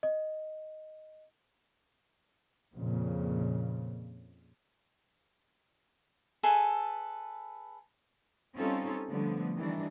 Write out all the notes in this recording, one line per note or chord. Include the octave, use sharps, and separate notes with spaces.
D#5
F2 A#2 C#3
G#4 A4 B4 E5
G3 C4 C#4 D#4 F4 A4
D3 F3 G3 A3 B3
D#3 E3 G3 D4